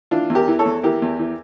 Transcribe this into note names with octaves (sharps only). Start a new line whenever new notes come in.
E3 D4 F4
E2
G4 A#4
E3
A4 C#5
E2
E3 G4 A#4
E2
E3